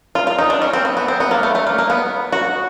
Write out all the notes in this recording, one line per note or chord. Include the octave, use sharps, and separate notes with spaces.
F4
F4
D#4
D4
C#4
C4
B3
B3
C4
B3
A#3
A3
A3
A#3
A#3
B3
F#4